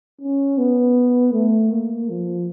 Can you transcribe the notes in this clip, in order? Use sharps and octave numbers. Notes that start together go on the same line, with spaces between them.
C#4
B3
A3
A#3
F3